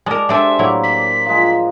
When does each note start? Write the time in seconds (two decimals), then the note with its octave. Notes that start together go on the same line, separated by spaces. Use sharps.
0.06 G#3 A#4 D5 A5
0.29 G#3 D4 G4 A4 C5 E5 G#5
0.59 A2 F#3 A#3 E4
0.84 B6
1.26 F3 G#3